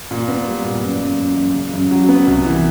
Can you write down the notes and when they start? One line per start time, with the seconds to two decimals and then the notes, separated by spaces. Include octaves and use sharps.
0.11 A#2
0.28 B3
0.47 G3
0.64 A#2
0.83 F#2
1.00 F#2
1.19 F#2
1.36 F#2
1.55 C#3
1.73 F#2
1.91 F#3
2.09 B3
2.27 C2
2.45 E3